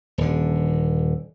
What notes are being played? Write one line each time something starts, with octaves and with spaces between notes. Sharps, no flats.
D#1 D3